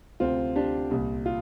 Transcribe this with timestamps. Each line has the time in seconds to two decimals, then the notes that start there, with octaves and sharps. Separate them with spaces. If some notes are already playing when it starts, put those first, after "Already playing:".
0.20 D2 C3 C4 F4
0.56 D4 G4
0.91 C2 A#2
1.26 F4